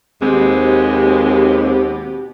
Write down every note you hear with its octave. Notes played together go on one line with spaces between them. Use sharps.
D#2 B2 G#3 C4 G4